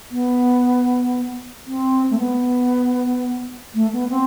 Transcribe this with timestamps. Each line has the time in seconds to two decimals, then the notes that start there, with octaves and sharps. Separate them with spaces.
0.11 B3
1.67 C4
2.10 A3
2.18 B3
3.74 A3
3.93 B3
4.10 C4